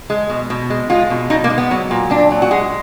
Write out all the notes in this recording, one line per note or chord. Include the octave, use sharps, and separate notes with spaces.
G#3
B2
B2
G#3
G#3 F4
B2
B2 D#4
A#3
G#3
B3
F#3
A#2
A#2 D4
F#3
F#4
G#3 G#4